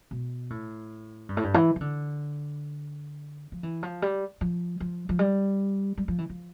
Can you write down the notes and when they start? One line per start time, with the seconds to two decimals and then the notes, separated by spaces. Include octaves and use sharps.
0.11 B2
0.50 A2
1.29 G2
1.37 A2
1.44 G2
1.54 E3
1.76 E3
1.81 D3
3.52 F3
3.63 E3
3.83 F3
4.02 G3
4.41 F3
4.80 F3
5.09 F3
5.19 G3
5.97 G3
6.08 F3
6.18 E3
6.29 F3